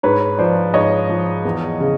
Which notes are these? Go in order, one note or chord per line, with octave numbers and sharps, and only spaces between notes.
G#2 B4 C#5
F3 C5 D5
G#2 C#5 D#5
F3
E2
C#3